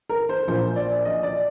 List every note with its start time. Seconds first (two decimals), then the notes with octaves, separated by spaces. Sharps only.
0.09 A#4
0.29 C5
0.48 A#1 A#2 C5
0.76 D5
1.05 D#5
1.23 D5